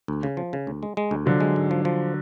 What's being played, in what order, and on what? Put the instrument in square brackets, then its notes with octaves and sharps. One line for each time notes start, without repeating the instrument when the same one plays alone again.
[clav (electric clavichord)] D2
C#3
F3
C#3
D2
G#3
G#3
D2
[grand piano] D3 F#3 [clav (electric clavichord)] F3
[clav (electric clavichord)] G#3
G#2
F3
F3